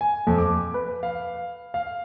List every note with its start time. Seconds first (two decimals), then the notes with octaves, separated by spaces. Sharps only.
0.01 G#5
0.27 F2
0.38 D6
0.74 B4
1.03 F5
1.74 F5